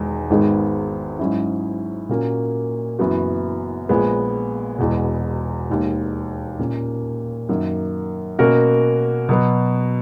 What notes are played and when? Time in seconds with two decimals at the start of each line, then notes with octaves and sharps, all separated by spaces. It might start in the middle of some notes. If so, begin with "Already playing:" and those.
Already playing: E1 E2 D#3 G#3 D#4
0.30 G#1 G#2 D#3 G#3 B3
1.19 G#2 F#3 C#4 E4
2.09 A#2 A#3 C#4 F#4 A#4
2.99 F#1 F#2 E3 B3 F#4
3.89 A#1 A#2 G#3 B3
4.79 E1 E2 B2
5.69 E1 D#2 D#3
6.59 A#2 A#3 C#4
7.49 F#2 D#3 A#3
8.39 B2 A#3 C#4 F#4 A#4
9.29 B2 F#3 B3